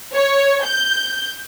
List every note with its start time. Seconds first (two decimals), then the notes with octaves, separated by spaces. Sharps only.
0.14 C#5
0.64 G6